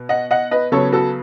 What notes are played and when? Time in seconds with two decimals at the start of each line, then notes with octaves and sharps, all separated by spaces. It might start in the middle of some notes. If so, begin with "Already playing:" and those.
Already playing: B2
0.09 D#5 F#5
0.31 D#5 F#5
0.51 B4 D#5
0.72 C#3 F#3 B3 A4 C#5
0.92 F#4 A4